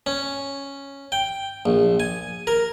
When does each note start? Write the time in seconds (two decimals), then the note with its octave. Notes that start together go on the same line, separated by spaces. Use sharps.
0.06 C#4
1.12 G5
1.66 A#1
2.00 G#5
2.47 A#4